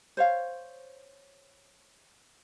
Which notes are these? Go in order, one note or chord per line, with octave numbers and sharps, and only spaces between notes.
C5 C#5 F5